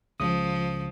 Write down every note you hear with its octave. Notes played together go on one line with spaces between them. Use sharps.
C#2 C#3 F3 D#6